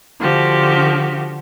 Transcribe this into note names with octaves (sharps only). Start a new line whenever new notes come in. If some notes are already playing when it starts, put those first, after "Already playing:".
D3 F3 F#4 G4